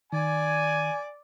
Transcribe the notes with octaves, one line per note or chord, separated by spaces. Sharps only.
D#3 D5 G#5